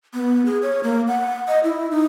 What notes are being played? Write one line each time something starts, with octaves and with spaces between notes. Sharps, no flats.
B3
G#4
C#5
A#3
F#5
D#5
E4
D#4